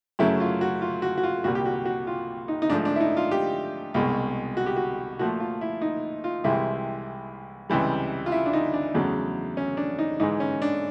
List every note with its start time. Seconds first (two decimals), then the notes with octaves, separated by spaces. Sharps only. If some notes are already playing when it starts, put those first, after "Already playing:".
0.19 F#2 C#3 F#3 A3 E4
0.40 F4
0.61 F#4
0.82 F4
1.02 F#4
1.17 F#4
1.23 F4
1.44 C2 A#2 G3 F#4
1.55 G4
1.65 F#4
1.85 F#4
2.07 F4
2.48 D#4
2.62 D#4
2.69 G#2 F3 A3 D4
2.85 D4
2.96 E4
3.00 D#4
3.17 F4
3.31 G4
3.94 C2 B2 G#3
4.57 F#4
4.66 G4
4.76 F#4
5.19 A#2 F3 A3 F#4
5.40 F4
5.61 E4
5.81 D#4
6.24 F4
6.44 C2 C3 E3 G#3 E4
7.69 C#2 C3 E3 G3
8.26 F4
8.32 E4
8.46 D4
8.53 D#4
8.74 D4
8.94 E2 C#3 F#3 A3
9.57 C#4
9.77 D4
9.99 D#4
10.20 G#2 E3 G#3 D#4
10.40 C#4
10.62 D4